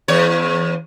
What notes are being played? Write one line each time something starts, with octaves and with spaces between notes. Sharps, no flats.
E2 C#5